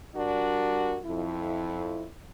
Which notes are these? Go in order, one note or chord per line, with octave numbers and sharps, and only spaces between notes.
G3 D4 F#4 A#4
F2 E4